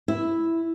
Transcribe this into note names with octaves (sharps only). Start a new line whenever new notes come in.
E4